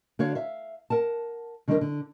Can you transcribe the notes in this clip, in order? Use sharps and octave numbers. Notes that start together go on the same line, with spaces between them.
D3 F#4 C#5 F5
E5 F5
A#4 F#5 A5
D3 D#3 G3 B3 D4 A#4
D3